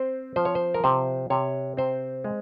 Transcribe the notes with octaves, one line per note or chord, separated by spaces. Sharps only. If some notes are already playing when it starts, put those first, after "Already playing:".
Already playing: C4 C5
F3 C5
C#5
C5
A#4
C3 C5
C3 C#5
C4 C5
G#3